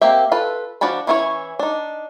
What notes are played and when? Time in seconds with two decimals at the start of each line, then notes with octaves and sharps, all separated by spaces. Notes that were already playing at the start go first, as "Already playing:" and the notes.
0.01 A#3 C4 G4 E5
0.32 F4 A4 B4
0.81 F3 D4 F#4 A5 B5
1.07 E3 C#4 E4 F4 C#5
1.59 D4 D#4